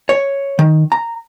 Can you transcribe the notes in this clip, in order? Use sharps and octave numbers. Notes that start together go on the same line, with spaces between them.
C#5
D#3
A#5